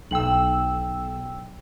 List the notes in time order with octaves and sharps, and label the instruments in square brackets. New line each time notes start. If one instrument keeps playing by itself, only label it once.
[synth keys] B1 E6 [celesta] G5 F#7